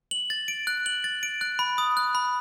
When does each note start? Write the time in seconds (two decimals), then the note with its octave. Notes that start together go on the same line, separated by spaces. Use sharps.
0.11 F#7
0.30 A6
0.48 D7
0.67 F#6
0.86 F#7
1.04 A6
1.23 D7
1.41 F#6
1.59 B5
1.78 D#6
1.97 F#6
2.15 B5